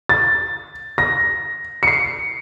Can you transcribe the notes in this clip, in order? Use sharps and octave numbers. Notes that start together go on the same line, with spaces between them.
A6
A#6
C#7
C7